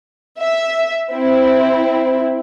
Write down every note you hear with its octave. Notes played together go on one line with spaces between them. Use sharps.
E5
C4 E4